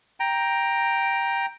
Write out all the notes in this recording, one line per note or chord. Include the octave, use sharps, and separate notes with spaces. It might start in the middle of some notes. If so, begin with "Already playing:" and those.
G5 A#5